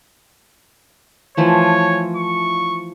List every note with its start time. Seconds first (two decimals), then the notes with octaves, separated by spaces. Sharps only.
1.37 E3 F3 A3 C#5
2.16 C#6